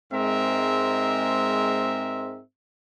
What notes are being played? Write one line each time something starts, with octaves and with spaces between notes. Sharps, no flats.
G#2 G#3 C4 A#4 E5